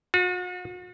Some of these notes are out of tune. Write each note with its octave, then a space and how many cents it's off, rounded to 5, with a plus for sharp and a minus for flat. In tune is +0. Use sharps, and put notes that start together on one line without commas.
F#4 -40